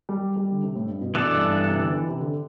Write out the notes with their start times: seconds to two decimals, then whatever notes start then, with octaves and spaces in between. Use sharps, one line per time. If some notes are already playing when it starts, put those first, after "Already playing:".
0.09 G3
0.36 G3
0.52 D3
0.63 C3
0.75 A2
0.88 G2
1.01 B2
1.15 B2 E3 B3 D4 A4 D5
1.33 G2
1.51 G2
1.68 C3
1.82 D3
1.94 E3
2.08 C3
2.21 D3